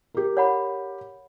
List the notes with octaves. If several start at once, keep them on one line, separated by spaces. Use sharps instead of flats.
G4 A#4
C#5 F#5 B5